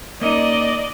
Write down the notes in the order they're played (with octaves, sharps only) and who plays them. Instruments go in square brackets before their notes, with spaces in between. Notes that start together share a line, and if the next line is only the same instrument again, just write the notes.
[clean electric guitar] A#3 C#4 D#4 [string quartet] D5 D#5